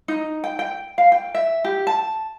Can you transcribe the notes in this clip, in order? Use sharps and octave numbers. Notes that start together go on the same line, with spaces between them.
D#4
G5
G5
F5
G5
E5
G4
A5